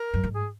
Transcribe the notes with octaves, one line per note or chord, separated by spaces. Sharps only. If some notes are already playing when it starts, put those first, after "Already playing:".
Already playing: A#4
F#2
G#2
G#4